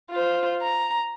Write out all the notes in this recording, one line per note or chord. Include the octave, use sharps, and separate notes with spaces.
F4 C5
A#5